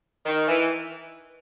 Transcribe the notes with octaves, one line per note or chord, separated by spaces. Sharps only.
D#3
E3